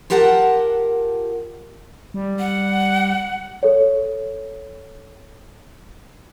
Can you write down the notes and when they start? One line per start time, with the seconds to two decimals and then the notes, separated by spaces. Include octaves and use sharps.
0.10 F4 G4 A#4 F#5 G5 A5
2.14 G3
2.39 F#5
3.63 A4 C#5